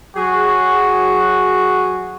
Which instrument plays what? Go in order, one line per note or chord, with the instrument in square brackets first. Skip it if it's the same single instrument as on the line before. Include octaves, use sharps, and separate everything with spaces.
[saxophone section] F#3 G#4 [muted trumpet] F#4